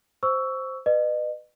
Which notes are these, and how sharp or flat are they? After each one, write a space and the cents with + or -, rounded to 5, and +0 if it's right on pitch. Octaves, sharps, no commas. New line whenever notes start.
C5 +0 C#6 +20 E6 +0
B4 +5 D#5 -35